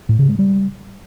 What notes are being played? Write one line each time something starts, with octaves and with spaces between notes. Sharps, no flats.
A2
C#3
G#3
G3